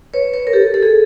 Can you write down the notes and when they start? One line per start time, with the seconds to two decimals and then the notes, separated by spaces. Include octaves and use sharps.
0.14 B4 C#5
0.33 B4 C#5
0.47 A#4
0.53 G4 A4
0.74 A4
0.83 G#4